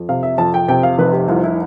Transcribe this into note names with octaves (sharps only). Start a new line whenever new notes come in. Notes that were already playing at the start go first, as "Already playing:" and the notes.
Already playing: F2
C3 F5
E5
F2 A5
G5
C3 G5
F5
F1 B4
G4
C2 F4
E4